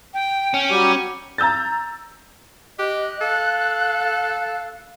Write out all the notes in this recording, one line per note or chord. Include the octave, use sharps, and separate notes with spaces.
G5
C#4
F#3 G3 G4
A#5 E6 G6 A6
G4 D#5 F#6
A4 F5